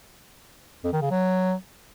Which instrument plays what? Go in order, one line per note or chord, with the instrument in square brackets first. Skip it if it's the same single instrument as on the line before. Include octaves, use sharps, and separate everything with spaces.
[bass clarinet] F2
D#3
C#3
F#3